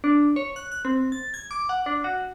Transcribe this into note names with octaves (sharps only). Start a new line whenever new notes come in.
D4
C#5
F#6
F#6
C4
A6
G#6
D6
F#5
D4
F#4